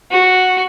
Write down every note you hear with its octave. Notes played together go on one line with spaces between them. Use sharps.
F#4